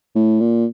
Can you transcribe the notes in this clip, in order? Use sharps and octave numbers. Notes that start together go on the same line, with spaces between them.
A2
A#2